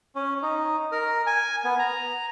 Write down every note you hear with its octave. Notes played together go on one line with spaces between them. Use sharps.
C#4
D#4
A#4
G#5
B3
A#5